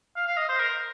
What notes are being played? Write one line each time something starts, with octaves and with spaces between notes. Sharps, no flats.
F5
F5
D#5
C5
A#4